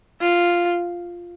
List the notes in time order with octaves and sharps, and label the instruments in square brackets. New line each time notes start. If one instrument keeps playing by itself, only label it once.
[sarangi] F4